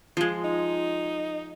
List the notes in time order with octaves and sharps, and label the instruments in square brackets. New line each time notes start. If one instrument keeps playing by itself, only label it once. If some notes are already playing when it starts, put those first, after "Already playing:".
[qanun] F3 G#3
[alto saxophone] D#4